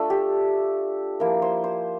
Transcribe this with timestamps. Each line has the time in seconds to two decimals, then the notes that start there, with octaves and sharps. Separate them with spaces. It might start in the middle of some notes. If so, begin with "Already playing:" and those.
Already playing: A3 D4 F4 A4
0.10 G4
1.20 F3 A#3 E4 A#4
1.42 C5
1.64 C5